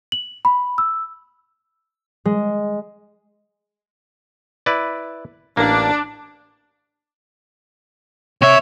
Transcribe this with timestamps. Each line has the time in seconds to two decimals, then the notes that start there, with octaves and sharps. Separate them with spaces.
0.12 F#7
0.45 B5
0.78 E6
2.25 G#3
4.66 E4 B4 D5
5.57 A1 A#3 D4
8.42 C3 C#5 E5